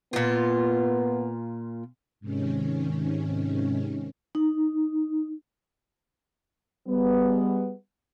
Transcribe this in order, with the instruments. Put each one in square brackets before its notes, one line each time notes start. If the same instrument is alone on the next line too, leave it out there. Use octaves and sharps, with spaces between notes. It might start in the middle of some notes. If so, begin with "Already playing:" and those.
[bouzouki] A#2 F4 [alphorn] B3
[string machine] G#2 C3 D#3 C#4
[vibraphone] D#4
[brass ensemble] G3 G#3 B3